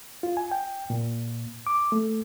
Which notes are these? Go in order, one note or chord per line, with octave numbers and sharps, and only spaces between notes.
F4
G#5
G5
A#2
D6
A3